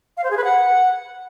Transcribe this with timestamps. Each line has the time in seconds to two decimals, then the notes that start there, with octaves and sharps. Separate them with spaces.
0.17 F5
0.24 C5
0.31 G#4
0.37 B4
0.44 F#5